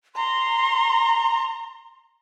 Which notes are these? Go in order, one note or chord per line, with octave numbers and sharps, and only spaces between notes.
A#5 C6